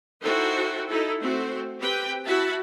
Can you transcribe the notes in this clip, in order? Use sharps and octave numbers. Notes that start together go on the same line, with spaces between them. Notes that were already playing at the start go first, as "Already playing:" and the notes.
D#4 E4 F#4 A4 C5 G5
D#4 E4 A4
A3 C4 F#4 C5
C4 G4 B4 G5
E4 F#4 E5 A5 B5